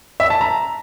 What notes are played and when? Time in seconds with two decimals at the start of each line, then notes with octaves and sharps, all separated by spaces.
0.20 E5
0.30 A5
0.41 A#5